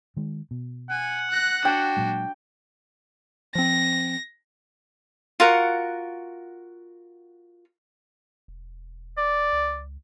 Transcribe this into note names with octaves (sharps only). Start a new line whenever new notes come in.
D#3 G#3
B2
F#5 G#5
F#6 A#6
D4 F#4 G5
A#2 F#3 G#3
F3 C4 A#6
F4 F#4 A#4 F#5
E1
D5
C#2